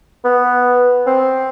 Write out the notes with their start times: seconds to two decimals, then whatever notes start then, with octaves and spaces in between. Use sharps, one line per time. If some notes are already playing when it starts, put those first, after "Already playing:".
0.24 B3
1.07 C4